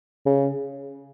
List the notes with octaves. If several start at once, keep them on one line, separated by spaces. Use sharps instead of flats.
C#3